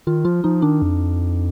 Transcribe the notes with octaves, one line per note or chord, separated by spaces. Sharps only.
D#3 F4
F3 F4
F3 D#4
D#3 D4
F2